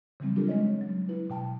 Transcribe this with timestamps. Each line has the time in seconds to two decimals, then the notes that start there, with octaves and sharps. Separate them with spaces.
0.20 C#3 E3 F#3 G3 C4
0.36 C4 D4 F4 G4 A4 A#4
0.48 G#3 C4 C#4 C#5 D#5
0.81 F#3
1.09 E4 B4
1.30 B2 G5 A5